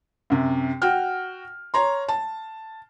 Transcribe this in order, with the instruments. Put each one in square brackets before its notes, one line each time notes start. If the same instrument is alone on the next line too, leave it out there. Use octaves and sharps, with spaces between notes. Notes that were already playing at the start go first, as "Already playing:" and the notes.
[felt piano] F#2 C3
F#4 G5 F6
C#5 A#5 C6
A5